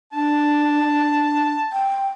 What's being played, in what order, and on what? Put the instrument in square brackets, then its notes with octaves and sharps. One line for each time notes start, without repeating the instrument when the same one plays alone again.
[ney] D4 [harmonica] A5
[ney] G5